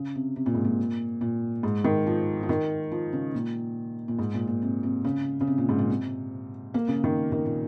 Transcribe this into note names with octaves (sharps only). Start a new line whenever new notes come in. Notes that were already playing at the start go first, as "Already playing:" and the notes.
Already playing: C#3
C3
C3
A#2
G#2
A#2
A#2
G#2
D#3
F3
F3
D#3
F3
C#3
A#2
A#2
G#2
A#2
A#2
C3
C3
C#3
C#3
C3
A#2
G#2
A#2
C3
A#3
C#3
D#3
D#3
A#2